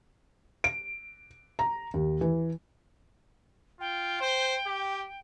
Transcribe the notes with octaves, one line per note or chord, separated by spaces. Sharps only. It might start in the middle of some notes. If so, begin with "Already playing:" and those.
D7
A#5
D#2
E3
F4 G5
C5
G4